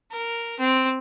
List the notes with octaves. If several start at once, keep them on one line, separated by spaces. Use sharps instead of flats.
A#4
C4